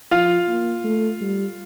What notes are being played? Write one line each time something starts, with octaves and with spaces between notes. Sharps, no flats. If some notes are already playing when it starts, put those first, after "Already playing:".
F3 F4 F5
A#3
A3
G3